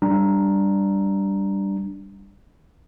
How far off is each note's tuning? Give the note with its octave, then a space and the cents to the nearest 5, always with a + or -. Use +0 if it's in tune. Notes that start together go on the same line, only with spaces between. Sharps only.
G3 +0 D4 +0 A#5 +0